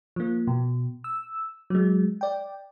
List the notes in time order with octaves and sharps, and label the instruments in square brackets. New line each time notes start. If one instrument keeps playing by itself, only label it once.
[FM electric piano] F3 A#3
B2
E6
F#3 G#3
D5 G5